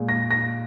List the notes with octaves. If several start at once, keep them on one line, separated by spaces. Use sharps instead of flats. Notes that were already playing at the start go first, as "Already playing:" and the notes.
Already playing: A#2 G#3
A#6
A#6